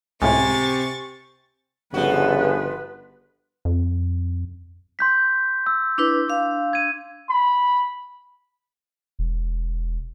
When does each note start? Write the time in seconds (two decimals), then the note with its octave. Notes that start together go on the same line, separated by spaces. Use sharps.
0.22 C#2 A2 C3 G#5 C#6 A6
1.94 G1 C#3 F3 F#4 B4
3.65 F2
4.99 C6 G6 B6
5.66 E6
5.98 D4 E4 B4
6.28 D4 F5
6.73 G#6 D#7
7.30 B5
9.19 E1